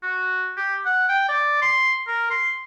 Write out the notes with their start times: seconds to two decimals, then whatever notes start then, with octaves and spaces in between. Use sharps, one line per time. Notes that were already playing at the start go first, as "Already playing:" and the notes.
0.03 F#4
0.57 G4
0.86 F#5
1.09 G5
1.29 D5
1.62 C6
2.07 A#4
2.30 C6